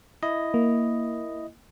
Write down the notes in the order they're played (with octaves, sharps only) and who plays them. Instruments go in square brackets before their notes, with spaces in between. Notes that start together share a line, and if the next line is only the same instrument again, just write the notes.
[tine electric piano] E4 D#5
[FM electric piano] A#3